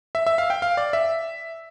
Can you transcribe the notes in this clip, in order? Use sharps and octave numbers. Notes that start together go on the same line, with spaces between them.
E5
E5
F5
G5
F5
D5
E5